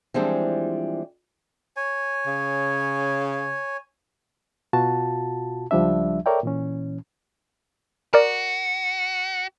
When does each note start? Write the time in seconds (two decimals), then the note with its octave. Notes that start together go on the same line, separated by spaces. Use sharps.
0.14 E3 F3 G3 G#3 C4 D4
1.77 C#5 G#5
2.27 C#3
4.73 B2 F4 F#4 A5
5.71 C#2 F3 G3 D4 E5
6.26 A4 A#4 C#5 D5 E5 G5
6.43 A#2 E3 C#4
8.14 F#4 A#4 D5